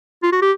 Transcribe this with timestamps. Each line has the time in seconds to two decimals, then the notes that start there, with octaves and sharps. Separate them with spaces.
0.23 F4
0.32 F#4
0.42 G4